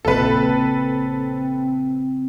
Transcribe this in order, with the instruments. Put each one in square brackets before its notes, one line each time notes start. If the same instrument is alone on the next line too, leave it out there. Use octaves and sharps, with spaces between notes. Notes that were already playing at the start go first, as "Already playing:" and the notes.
[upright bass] A#1 C#3 [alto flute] C4 [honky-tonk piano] A4 B4